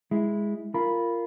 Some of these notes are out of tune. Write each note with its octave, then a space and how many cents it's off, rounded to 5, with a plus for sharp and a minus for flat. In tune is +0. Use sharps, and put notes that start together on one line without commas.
G#3 +0 E4 +0
F4 -15 A#4 -10 B5 -5